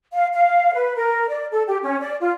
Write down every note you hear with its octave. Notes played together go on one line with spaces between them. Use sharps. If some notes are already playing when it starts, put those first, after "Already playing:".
F5
F5
B4
A#4
D5
A4
G4
C#4
D5
F4